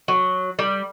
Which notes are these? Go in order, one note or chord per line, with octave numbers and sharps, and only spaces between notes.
F#3
G3